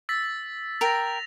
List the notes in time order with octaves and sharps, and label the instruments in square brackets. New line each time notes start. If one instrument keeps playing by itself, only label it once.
[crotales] E6 A6 B6
[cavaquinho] A#4 G5 [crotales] A#6 F7